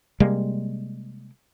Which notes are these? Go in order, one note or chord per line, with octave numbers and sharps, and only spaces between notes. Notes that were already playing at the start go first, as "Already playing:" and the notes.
C3 G3 G#3 A#3